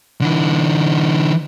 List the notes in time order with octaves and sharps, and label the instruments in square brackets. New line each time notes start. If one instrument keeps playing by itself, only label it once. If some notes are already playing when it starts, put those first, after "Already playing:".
[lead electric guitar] D3 E3